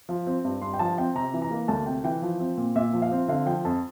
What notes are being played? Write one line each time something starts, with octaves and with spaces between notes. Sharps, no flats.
F3
C4
G2
G2 C6
G5
F3 A5
C4 G5
C3 A#5
E3
A#5
A#3
D2 A5
C3 G5
E3 G5
F3
C4
A#2
A#2 E5
F3
F5
C4
D3 F5
F3 G5
F2 A5